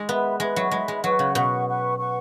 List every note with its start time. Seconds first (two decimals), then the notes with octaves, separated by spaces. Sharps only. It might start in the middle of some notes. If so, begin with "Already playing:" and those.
Already playing: G#3
0.08 B3 B4 E5 B5
0.40 G#3 B4 E5 B5
0.56 F#3
0.71 G#3 B4 E5 B5
0.88 G#3
1.04 F#3 B4 F#5 C#6
1.19 C#3
1.35 B2 B4 F#5 C#6
1.67 B4 F#5 C#6
1.98 B4 F#5 C#6